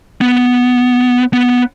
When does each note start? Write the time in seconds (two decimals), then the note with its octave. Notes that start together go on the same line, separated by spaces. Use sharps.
0.21 B3
1.33 B3